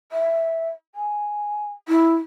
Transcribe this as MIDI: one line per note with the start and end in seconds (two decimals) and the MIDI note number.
0.12 0.69 76
0.95 1.72 80
1.89 2.15 64